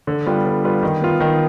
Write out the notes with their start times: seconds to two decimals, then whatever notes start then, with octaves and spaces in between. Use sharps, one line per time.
0.07 D3
0.26 G3 B3 F4 B4
0.46 D3
0.64 G3 B3 F4 B4
0.83 D#3
1.01 B3 F4
1.20 D#3